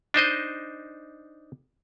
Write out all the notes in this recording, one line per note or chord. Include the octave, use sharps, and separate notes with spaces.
D4 D#4 C5 D#5